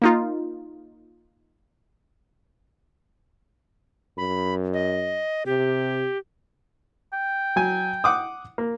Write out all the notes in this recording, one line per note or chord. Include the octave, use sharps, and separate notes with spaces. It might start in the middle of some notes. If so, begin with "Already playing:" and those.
A#3 D#4 F4
F#2 B5
D#5
C3 G4
G5
F#3 G#5
F#5 D6 D#6
A#3